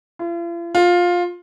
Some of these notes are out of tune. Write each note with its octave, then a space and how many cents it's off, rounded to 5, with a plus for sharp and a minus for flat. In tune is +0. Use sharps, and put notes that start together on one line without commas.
F4 -45
F4 +15